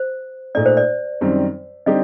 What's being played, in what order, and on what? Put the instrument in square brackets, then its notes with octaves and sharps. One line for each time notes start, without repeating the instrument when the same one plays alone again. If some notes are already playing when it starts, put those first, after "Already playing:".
Already playing: [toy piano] C5
[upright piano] A#2 A3 D#4 [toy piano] D5
[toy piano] C5
D5
[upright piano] F#2 D#3 G3 C4
[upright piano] D3 G3 C4 D#4 G4 [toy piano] D#5